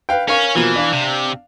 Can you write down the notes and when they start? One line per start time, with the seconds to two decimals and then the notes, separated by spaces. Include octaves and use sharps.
0.09 B4 F5 G5
0.28 C#4 A#4 F5 C#6
0.55 B2 E3 F3 A#3
0.76 D4 F5
0.93 C3